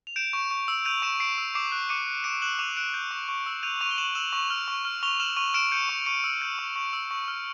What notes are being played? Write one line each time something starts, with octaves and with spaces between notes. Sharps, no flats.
F7
G6 D7 E7
C#6
C#6
E6
G6 D#7 F7
C#6 D7 E7
C#6 C7 D7
E6
D6 C7 D7
F#6
D6 C#7 D#7
F#6
D6 D7 E7
F#6 E7 F#7
D6 D#7 F7
F#6 D7 E7
G6
C#6
C#6
E6
G6 D#7 F7
C#6 D#7 F7
G7
C#6 E7 F#7
E6 E7 F#7
C#6
F6
C#6
F6
C#6 F7 G7
F6 E7 F#7
C#6 D#7 F7
F6 D7 E7
G6 C#7 D#7
C#6
C#6 C#7 D#7
E6
G6
C#6
C#6
E6
C#6
F6